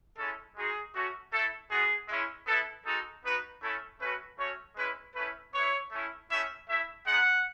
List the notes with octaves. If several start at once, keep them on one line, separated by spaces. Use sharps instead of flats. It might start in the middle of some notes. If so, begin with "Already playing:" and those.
G#3 C#4 E4 A4
G#3 D#4 F#4 G#4
A3 C#4 F#4
A3 E4 A4
G#3 B3 F#4 G#4
G#3 C#4 E4
B3 E4 A4
G#3 D#4 F#4 A4
B3 D#4 F#4 B4
A3 C#4 E4 A4
A3 C#4 F#4 B4
A3 C#4 F#4 C#5
G#3 C#4 E4 B4
A3 C#4 E4 B4
B3 E4 C#5
A3 C#4 E4
A3 C#4 E4 E5
A3 E4 E5
G#3 B3 D#4 F#5